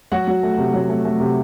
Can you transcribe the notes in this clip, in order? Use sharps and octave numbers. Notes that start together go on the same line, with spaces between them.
F#3 F#4 F#5
F#3
A3
C3
F#3
A3
A3
C3